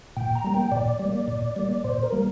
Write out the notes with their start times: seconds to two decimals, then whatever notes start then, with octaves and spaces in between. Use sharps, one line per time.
0.16 A#2 G5
0.35 A#5
0.44 G3 A#3
0.54 G5
0.72 A#2 D5
0.99 G3
1.05 A#3
1.28 A#2
1.56 G3 A#3
1.84 A#2 C5
2.03 A#4
2.12 G3 A#3